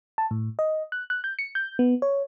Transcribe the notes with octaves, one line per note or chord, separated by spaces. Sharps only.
A5
A2
D#5
F#6
F#6
G6
C#7
G6
B3
C#5